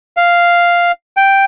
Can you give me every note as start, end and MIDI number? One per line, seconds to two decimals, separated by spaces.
0.17 0.92 77
1.17 1.45 79